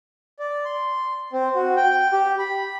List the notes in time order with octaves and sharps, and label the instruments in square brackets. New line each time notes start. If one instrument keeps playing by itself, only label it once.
[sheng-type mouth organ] D5
C6
C4
F#4
G5
G4
B5